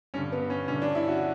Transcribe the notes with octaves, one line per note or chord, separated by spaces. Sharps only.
G2 D3 C#4
B3
C#4
G2 D3 C#4
D4
E4
F#4